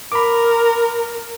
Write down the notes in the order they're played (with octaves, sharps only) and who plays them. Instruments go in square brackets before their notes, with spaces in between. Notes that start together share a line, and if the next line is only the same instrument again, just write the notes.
[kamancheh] A#4 [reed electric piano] B5 D6